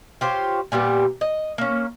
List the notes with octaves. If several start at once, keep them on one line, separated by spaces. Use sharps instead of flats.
F4 G4 C5 C#5
A#2 G3 B3 G4
D#5
A#3 C#4